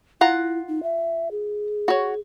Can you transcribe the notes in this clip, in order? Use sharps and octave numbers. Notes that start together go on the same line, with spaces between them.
E4 F4 F#5 A#5
D#4
E5
G#4
F#4 C#5